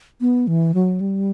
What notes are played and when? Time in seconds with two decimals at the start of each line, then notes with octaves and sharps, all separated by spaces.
0.21 B3
0.47 E3
0.74 F#3
1.01 G3